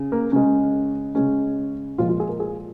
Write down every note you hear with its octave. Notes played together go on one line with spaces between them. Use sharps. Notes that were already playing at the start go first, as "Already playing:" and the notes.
Already playing: C#3
A#3
C#3 G#3 C#4
C#3 G#3 C#4
A#2 F3 G#3 F4
F4
G#4
A#4
G#4